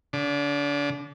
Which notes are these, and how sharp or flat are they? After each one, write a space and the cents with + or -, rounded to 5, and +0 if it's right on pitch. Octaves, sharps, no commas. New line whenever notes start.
D3 -35 D6 +20